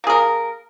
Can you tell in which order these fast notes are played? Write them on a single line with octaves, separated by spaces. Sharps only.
A#3 G#4 A#4